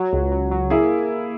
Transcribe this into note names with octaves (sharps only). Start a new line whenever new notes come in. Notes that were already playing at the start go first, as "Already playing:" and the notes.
Already playing: F#3
C#2
F#3
F#3
A#3 E4 G#4